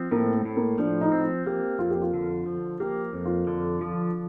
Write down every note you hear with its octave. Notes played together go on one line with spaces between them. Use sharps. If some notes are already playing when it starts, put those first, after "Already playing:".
Already playing: F3 C4
A2 A#3
A2
A#3
F3 D4
D#4
C4
A#3 G4
F2 F4
G4
F4
D3
F3
A#3 G4
F2
F4
D3
F3